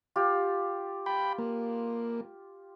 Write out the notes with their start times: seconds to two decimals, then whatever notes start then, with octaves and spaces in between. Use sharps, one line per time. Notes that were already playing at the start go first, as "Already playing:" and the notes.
0.16 F4 G4
1.06 G5 B5
1.38 A#3